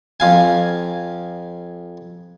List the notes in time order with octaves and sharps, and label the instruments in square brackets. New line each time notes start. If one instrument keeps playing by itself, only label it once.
[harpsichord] F2 F5 G#5